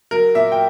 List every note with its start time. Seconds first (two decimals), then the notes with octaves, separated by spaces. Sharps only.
0.11 F#3 A#4
0.35 A#2 E5
0.52 G5